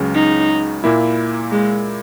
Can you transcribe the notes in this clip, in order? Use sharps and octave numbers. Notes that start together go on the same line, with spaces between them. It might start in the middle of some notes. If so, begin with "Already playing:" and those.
Already playing: C#2 C#3 F#3
D#4
A#2 A#3 E4
G#3